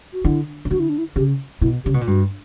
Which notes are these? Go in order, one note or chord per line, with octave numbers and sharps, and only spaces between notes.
F#4
D3 E4
C#3
D3 F#4
E4
D4
E4
C#3 G4
B2 E4
C#3 G4
B2
A#2
G2 F#4